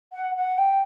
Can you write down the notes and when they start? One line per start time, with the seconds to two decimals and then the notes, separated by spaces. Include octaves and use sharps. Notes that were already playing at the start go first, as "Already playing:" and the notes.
0.12 F#5
0.35 F#5
0.57 G5